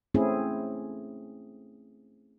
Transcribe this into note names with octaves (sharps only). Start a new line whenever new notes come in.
A3 C4 C#4 E4 G#4